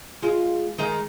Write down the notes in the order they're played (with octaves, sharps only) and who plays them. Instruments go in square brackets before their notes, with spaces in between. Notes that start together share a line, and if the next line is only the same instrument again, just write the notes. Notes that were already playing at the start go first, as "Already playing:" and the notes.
[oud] G#3 F4
D#3 G#3 D#4